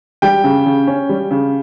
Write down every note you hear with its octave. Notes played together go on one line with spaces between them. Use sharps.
G3 G5
C#3
C#3
C#4
G3
C#3